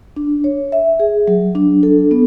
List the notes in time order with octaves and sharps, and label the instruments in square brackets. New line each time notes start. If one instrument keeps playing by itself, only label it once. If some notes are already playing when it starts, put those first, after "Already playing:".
[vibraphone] D4
C#5
E5
G#4
F#3
D4
A4
B3